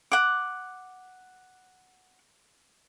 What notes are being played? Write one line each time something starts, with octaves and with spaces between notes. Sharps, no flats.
F#5 D6